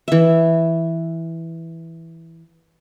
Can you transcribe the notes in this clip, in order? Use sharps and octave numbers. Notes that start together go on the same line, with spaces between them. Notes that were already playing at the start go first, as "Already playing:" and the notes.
E3 E5